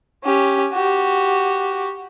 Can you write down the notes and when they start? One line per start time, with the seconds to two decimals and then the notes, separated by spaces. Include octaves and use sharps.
0.24 C#4 G4
0.73 F#4 G4